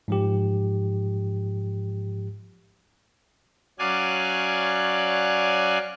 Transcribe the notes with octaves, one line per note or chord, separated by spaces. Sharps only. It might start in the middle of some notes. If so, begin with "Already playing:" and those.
G#2 F3 G4
F#3 C#4 D5 F5 G#5 F#6